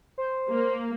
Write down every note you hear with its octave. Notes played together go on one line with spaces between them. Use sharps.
C5
A#3